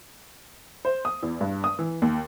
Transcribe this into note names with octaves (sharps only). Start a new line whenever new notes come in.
C5
D#6
E2
G2
D#6
E3
D#2